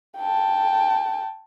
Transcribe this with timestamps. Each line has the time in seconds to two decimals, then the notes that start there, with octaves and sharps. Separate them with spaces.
0.18 G5 A5